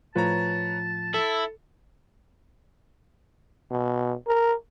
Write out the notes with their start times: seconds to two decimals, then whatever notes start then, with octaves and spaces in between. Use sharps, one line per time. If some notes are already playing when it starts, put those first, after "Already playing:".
0.16 A2 F3 F4 B4 C#5 A5 A#5
1.14 E4 A4
3.71 B2
4.27 A#4